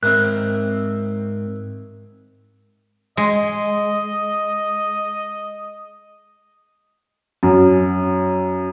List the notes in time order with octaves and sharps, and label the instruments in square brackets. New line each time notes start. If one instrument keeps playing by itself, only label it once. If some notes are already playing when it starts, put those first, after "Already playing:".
[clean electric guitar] G#2 C4 [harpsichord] D#3 E4 A#4 [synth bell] F#6
[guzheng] G#3 [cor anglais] D#5
[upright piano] F#2